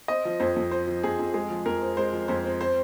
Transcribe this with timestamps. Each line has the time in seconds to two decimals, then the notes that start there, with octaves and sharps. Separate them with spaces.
0.08 C4 D#5
0.25 F3
0.40 F2 C5
0.56 F2
0.71 C4 C5
0.87 F3
1.03 F2 G#4
1.19 F2
1.34 G#3 G#4
1.50 F3
1.66 F2 A#4
1.82 C4
1.97 G#3 C5
2.13 F3
2.28 F2 C5
2.44 C4
2.61 C4 C5